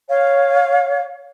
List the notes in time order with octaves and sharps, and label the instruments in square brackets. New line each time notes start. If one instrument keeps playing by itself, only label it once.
[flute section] C#5 F5